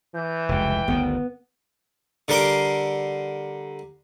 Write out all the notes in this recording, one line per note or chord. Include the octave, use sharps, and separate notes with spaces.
E3 G6
F1 C#2 G5
G1 D2 D#3 B3
D3 G3 A#4 C6 D6